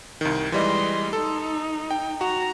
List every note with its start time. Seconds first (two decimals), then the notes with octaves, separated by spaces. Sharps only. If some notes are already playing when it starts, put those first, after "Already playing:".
0.21 C2 D#3
0.52 E3 G3 G#3 D#5 C6
1.13 D#4 A4
1.91 G5
2.21 F#4 A#5